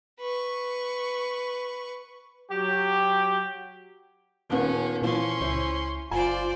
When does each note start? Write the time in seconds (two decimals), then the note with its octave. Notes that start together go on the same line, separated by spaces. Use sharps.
0.20 B4 C#6
2.51 F#3 G4
4.50 D#1 D#2 B3 C#4
5.02 A#2 E3 F3 C#4 C6
5.41 C#2 E4 C5
6.11 F#1 F4 C5 D5 G#5